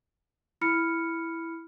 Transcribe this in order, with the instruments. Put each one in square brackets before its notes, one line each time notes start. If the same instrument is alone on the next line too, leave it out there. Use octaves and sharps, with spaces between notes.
[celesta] E4 B5 F6 C#7